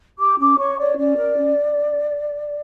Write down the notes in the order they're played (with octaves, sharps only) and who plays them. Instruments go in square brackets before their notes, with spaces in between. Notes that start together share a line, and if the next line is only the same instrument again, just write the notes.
[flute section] G4 D6
C#4 D6
C#5 C#6
C#5 D5
C#4 D5
A#4
C#4